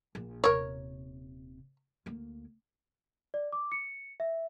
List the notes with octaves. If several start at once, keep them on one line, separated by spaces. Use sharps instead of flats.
A#1
D#1 C3 A#4 C#5
D2 A#3
D5
D6
C#7
E5